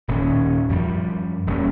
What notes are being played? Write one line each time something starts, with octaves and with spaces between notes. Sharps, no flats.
D#1 A#2 D#3 C#4
F#2 F3 G3
E1 G3 A#3 C#4